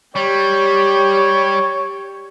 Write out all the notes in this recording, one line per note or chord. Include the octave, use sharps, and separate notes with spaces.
G3 G4 C#5